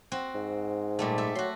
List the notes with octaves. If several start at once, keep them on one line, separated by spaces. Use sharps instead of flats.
C4 F#4
G#2
A#2 G3 A3
G4 A4 E5
F#3 F#4 C6